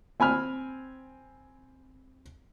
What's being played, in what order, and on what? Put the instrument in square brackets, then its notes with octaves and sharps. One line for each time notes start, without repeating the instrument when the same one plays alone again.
[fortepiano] C4 G#5 B5 F6